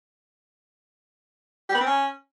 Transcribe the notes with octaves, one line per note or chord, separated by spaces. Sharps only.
G4
B3
C4
C#4